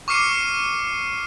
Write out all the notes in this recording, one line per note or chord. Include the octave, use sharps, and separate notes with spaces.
C#6 D6 F6 C7 C#7 D#7